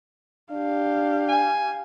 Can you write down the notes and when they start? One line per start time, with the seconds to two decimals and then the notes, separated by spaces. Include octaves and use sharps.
0.52 D4 G4 F5
1.29 G#5